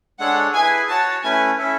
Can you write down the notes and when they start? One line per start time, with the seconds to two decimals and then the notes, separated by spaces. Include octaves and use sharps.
0.19 G#3 D4 A4 C#5 F#5
0.54 E4 G#4 B4 G#5
0.89 F#4 C#5 F#5 A5
1.23 A3 C#4 E4 B4 G#5
1.58 C#4 E4 A4 E5